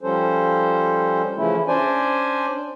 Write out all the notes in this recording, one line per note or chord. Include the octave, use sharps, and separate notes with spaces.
F3 G3 C#4 A4 C5
C#3 E3 F3 A3 C#4 E4
C#4 D4 C5 D5 G#5